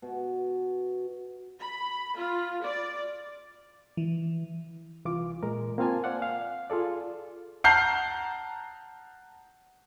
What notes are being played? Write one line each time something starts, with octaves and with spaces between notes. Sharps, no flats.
B2
B5
F4
D5
E3
C2 E3 F4 D6
A#2 G#3 A#4
A#3 C4 F4 F5 G#5 A5
C5 D5 F5 F#5 G#5
F5
F4 G#4 A4 D5
F#5 A5 A#5 F6 G6 C7